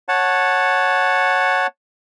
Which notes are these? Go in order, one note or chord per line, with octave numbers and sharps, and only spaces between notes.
C#5 F#5 A5